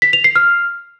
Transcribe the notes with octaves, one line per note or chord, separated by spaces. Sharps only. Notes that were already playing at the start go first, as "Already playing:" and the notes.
B6
F7
C7
F6